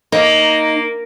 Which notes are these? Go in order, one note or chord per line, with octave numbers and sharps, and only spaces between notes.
A#3 D#4